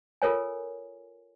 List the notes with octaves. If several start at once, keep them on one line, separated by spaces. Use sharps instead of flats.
F4 A4 A#4 C#5 G#5